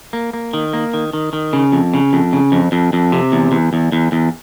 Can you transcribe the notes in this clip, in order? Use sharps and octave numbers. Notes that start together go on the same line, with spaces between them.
A#3
A#3
D#3
A#3
D#3
D#3
D#3
C#3
F2
C#3
F2
C#3
F2
F2
F2
C3
E2
E2
E2
E2
E2